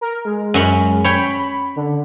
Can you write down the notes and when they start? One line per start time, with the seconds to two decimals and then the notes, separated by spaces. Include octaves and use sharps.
0.01 A#4
0.25 G#3
0.54 F#2 C#4 B5
1.04 C#5 G5 B5
1.76 D3